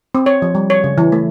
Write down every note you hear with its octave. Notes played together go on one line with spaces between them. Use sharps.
C4
C#5
F3
G3
C#5
C#3
E3
A3